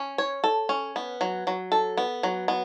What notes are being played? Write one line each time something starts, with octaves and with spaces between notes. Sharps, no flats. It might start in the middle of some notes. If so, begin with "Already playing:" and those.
Already playing: C#4
C#5
A4
C#4
B3
F#3
F#3
A4
B3
F#3
B3